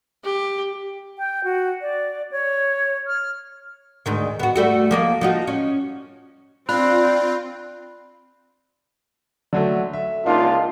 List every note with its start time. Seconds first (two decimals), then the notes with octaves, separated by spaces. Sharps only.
0.25 G4
1.18 G5
1.44 F#4
1.81 D5
2.31 C#5
3.07 F6
4.06 D2 G#2 D#3
4.39 B3 F#4
4.56 G3 A3 F#4
4.91 F3 A#3 D#5
5.21 F3 D#4 F#4
5.48 C#4
6.69 C4 D4 F4 B5 F#6
9.53 D3 F#3 A3
9.93 E5
10.26 C#2 A#3 D4 D#4 F4 A#4